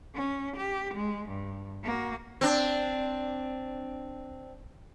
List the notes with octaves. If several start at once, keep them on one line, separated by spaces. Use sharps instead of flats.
C#4
G4
G#3
G2
A#3 F#4
C4 D4